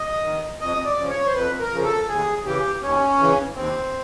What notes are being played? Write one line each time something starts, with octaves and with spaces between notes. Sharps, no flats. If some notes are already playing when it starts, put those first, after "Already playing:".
Already playing: D#5
D#3
F2 D#5
D5
C#3 F3
C#5
C5
F2 B4
A#4
C#3 F3
A4
D#2 G#4
C#3 E3 G4
D#2 C#4
C#3 E3
D#2 C4